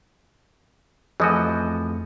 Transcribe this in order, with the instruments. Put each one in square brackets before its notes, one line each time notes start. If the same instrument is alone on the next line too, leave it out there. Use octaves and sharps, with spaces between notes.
[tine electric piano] F2 A3 [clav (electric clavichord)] E3 F3 F#4 [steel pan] G#4 D#5